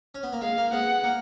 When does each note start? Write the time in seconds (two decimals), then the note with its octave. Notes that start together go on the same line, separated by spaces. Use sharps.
0.15 C#4
0.23 B3
0.32 A#3
0.41 G#3 F5
0.57 A#3
0.72 G#3 B3 F#5
1.04 A#3